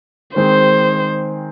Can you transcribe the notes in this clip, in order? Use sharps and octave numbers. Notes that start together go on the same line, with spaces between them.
D#3 G#3 C4 G#4 C5